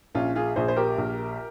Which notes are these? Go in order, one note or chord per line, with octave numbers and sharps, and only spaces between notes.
A#1 C#4 F4
F4 G#4
A#1 G#4 C5
C5
G4 A#4
A#1